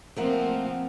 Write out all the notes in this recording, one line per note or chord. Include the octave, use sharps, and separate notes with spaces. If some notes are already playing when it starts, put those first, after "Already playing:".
F3 A3 A#3 C4 A#4 F#5